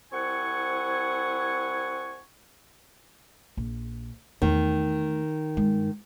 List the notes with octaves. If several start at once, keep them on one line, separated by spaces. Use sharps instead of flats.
C2 C4 E4 F#5 G#5 C#6
A#1
E2 D#3 A3
G2 G#3